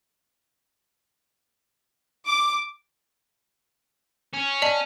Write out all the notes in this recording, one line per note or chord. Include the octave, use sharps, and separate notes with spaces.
D6
C#4
D5 D#5 A5